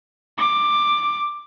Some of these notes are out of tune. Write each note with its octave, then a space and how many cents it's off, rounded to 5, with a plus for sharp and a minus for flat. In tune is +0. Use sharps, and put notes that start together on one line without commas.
D6 +10